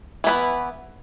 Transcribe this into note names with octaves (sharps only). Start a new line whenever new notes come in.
E3 B3 E4 B4